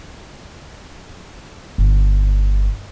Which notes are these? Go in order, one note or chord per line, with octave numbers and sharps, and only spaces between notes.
G1